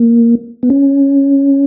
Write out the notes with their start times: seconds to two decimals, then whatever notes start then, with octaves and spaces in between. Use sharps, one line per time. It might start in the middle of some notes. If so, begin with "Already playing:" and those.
Already playing: A#3
0.63 B3
0.70 C#4